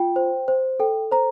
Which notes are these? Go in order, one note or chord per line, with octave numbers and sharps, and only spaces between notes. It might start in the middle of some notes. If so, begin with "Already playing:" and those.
Already playing: F4 G5
C5
C5
A4 G5
C5 A#5